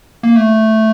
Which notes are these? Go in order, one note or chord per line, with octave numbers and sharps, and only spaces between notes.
A#3
A3